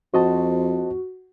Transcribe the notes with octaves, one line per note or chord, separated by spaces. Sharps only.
F2 F#4 C5 D#5 A5